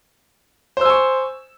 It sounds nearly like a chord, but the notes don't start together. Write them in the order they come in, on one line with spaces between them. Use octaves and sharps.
C5 E6 G#5 C#6